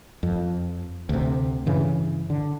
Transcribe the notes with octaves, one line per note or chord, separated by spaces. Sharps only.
F2
D2 C3
G2 C#3 E3
D3